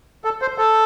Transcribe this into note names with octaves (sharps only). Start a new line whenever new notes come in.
A4
C5
A4